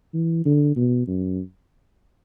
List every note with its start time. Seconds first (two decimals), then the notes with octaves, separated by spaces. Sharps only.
0.14 E3
0.45 D3
0.76 B2
1.07 F#2